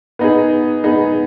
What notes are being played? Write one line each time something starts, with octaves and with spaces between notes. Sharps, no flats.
B3 D#4 G#4
B3 D#4 G#4